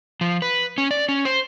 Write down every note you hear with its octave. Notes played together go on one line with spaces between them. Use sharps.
F3
B4
C#4
D5
C#4
C5